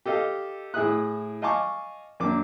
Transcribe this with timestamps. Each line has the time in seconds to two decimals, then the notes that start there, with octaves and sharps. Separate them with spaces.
0.06 G4 A4 D#5 F5
0.74 A2 E4 G#4 E5 D#6 F#6
1.42 D#5 F5 G#5 A5 C#6 D6
2.20 F#2 A#3 D4 D6